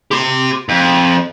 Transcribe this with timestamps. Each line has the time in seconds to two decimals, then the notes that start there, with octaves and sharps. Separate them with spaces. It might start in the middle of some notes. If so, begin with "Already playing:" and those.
0.11 G4 C6
0.69 F2